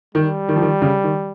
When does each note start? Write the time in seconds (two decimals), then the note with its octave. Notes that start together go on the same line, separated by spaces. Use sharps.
0.15 D#3 G3
0.49 D#3
0.56 F3
0.62 D#3
0.82 C#3
1.04 D#3